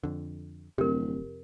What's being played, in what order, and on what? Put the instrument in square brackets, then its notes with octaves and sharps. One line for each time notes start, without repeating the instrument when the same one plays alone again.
[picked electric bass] F2 D3
[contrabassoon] D1 [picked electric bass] F2 C3 [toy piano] G4 A#4